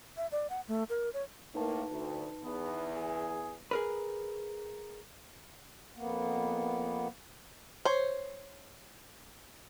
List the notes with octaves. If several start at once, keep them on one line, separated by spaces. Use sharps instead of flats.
E5
D5
F#5
A3
A#4
C#5
A2 A#3 D#4 B4 A5
D2
E2 B3
G#4
G#4 A#4 B4
F2 A#3 B3
C5 C#5